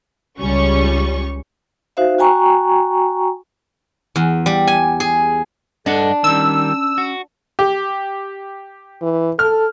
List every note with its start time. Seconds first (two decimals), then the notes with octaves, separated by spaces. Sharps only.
0.39 C#2 G3 C#4 C#6
1.97 D#4 F#4 C5 E5 F5
2.18 F#4 G5 G#5 A#5 C#6
4.16 E2
4.46 G3
4.67 G#5
5.00 G#4
5.86 G2 D4 A4 D#5 F#5
6.24 D#3 G3 C#4 E6
6.98 F#4
7.59 G4
9.02 E3
9.39 A4 F6